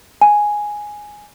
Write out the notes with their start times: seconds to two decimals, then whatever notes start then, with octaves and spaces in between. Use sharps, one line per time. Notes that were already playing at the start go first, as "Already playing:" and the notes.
0.21 G#5